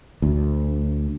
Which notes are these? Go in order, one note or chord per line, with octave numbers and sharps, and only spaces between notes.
D2